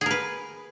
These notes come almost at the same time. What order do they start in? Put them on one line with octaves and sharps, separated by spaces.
G#4 A#4 B4